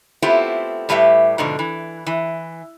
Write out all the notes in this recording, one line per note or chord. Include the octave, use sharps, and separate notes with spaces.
A3 B3 C4 E4 F4 G4
A2 G3 G4 B4 E5
G#2 B2 D3 F3
E3
E3